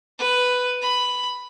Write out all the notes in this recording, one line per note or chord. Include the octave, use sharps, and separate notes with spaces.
B4
B5